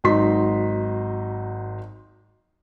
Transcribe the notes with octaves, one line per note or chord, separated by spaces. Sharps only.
G#1 F#3 D#4 C6 B6